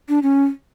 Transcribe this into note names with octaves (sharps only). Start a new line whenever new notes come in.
D4
C#4